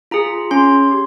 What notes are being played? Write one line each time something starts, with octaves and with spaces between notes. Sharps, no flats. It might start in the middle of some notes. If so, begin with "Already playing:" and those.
F4 G#4 A#5
C#4 C6
G4